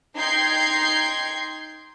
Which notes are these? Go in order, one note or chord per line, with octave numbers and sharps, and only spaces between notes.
D#4 G5 C6 G6 G#6 C7